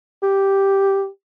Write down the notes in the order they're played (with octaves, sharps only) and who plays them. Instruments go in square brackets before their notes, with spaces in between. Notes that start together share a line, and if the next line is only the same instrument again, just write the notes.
[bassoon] G4